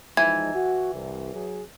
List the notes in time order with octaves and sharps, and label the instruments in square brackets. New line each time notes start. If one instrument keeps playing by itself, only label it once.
[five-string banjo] E3 [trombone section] F3 G#3 D#4 [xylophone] G#6
[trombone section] F#4
C2
F#3 G#4